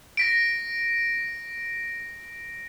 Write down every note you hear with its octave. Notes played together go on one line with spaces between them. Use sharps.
A#6 B6 D7